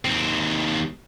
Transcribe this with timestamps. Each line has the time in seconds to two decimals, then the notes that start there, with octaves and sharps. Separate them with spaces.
0.05 D#2 C4